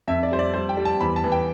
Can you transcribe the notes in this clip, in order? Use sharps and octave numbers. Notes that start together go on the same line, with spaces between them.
F2 E5
D5
G3 C5
D5
G3 C5
G5
G3
A5
E2 B5
A5
E3
G5